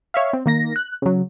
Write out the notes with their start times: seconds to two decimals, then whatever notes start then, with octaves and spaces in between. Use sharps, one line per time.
0.14 C#5 E5 F5
0.33 C4
0.46 D#3 A#3 A#6
0.76 F#6
1.02 C#3 F#3